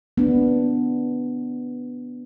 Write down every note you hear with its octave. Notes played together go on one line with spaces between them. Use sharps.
B3 D4